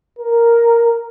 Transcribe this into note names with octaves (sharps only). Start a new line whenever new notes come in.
A#4